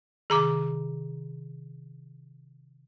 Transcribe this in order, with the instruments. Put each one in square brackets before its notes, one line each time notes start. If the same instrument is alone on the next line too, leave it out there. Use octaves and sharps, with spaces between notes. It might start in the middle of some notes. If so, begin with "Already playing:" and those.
[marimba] C3 D#3 [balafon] G#4 A#5 D6